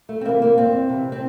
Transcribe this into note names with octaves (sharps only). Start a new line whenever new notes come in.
A3
C4
C3 E3 A#3
A#3
E2 C4
C3 E3
C4